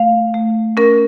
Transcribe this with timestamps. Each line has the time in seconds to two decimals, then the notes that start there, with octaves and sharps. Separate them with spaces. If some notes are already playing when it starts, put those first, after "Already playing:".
Already playing: A3 F5
0.34 A3
0.77 C#4 A#4